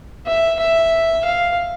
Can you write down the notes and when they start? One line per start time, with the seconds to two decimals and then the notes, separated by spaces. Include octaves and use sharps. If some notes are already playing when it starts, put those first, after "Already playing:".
0.26 E5
0.59 E5
1.25 F5